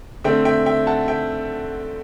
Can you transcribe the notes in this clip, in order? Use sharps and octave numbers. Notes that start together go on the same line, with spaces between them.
D3 A3 C4 E5 G5
E5 G5
E5 G5
F#5 A5
E5 G5